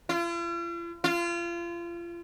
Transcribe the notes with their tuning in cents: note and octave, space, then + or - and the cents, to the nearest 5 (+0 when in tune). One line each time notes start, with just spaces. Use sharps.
F4 -45
F4 -30